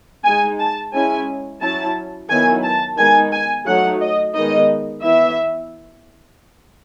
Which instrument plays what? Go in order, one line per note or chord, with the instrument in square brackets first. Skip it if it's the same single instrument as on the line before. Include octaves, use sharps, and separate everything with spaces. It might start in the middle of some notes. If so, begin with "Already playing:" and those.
[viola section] G#3 D#4 G#5
A5
G#3 C#4 E4 G#5
F#3 C#4 E4 A5
D#3 F#3 B3 E4 G#5
A5
D#3 G#3 B3 D#4 G#5
G#5
F#3 A3 D#4 F#5
D#5
D#3 G#3 B3 D#4 D#5
E3 B3 E4 E5